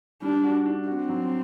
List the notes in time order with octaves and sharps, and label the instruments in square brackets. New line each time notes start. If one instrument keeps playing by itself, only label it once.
[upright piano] G3 [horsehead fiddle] D4
[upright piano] F#4
D4
[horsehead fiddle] C4 [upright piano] F#4
[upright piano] F#3